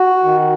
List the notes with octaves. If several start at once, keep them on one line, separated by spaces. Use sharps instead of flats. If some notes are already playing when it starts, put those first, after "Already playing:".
Already playing: F#4
D#3